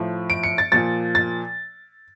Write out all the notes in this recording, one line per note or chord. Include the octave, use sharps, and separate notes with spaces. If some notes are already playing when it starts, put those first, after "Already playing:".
Already playing: A2 F3
D7
C#7
A6
A#2 F3 A6
A6